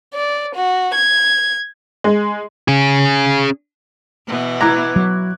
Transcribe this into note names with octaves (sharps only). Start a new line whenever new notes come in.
D5
F#4
G#6
G#3
C#4 G#4
B2 E3 B3
E4 A#5 D6 F#6 G#6
F#3